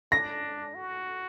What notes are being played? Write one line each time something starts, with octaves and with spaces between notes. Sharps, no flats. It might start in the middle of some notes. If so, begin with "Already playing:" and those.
D4 A#6
F#4